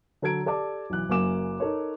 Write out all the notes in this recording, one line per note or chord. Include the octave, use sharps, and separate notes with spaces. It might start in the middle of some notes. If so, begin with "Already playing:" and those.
D3 F#3 A4 A#5 G#6 D7
G4 A4 D5 A5 D6
B1 E3 F#6
F#1 F#2 A#3 G#5 D6 E7
D#4 A4 A#4 C#5